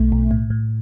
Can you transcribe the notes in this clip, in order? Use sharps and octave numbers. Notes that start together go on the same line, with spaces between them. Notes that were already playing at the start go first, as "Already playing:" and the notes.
Already playing: B1 B2 A3
B1
A2
A2